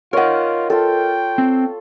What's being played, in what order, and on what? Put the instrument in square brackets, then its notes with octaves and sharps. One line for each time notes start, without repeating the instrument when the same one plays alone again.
[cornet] F4 [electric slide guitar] A#4 D#5 [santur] C#5 F#5
[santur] F4 A4 [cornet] G5
[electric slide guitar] C4